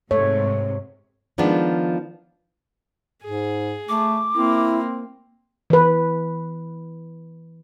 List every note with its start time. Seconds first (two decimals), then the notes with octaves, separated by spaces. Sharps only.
0.11 G#2 C3 A3 C#5
1.38 D#3 F3 G#3 B3 D4
3.24 G#2 G#4
3.89 A3 D6
4.35 A#3 C4 E4
5.70 E3 B4